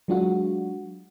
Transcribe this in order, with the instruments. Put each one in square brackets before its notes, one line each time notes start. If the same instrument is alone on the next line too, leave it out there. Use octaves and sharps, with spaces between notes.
[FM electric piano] F#3 G#3 D4 F4 F#4